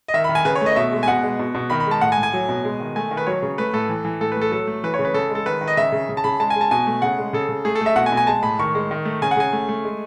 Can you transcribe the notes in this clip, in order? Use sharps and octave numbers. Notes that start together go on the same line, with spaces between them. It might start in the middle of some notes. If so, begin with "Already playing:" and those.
D#5
D#3 E5
B5
D#3
G#5
C#3 B4
C#5
A3 D#5
D#5
B2 E5
G#3
G#5
B2 F#5
G#3
B2
B2
D#3 B5
B5
G#3 A5
A2 F#5
G#5
A2
G#5
F#3
B2
G#3
D#3
A3 G#5
D#3
B4
F#3 C#5
C#3
A3 B4
A2 A4
E3
E3
A2 A4
B4
A3
A4
F#3 A4
A3
E3 B4
C#5
C#3
B4
C#3 A4
G#3 A4
D#3 B4
D#3
D#5
C#3 E5
C#3
C#3
A5
C#3 B5
G#3 A5
G#5
G#3
A5
B2 G#5
A3
C#3 F#5
G#3
C#3 A4
C#3
A3 G#4
A4
A3 E5
B2 F#5
G#5
B2
G#5
G#3 A5
A2 B5
D#3 C#6
G#3
D#3
A3
C#3 G#5
F#5
C#3 G#5
A3
A3
G#3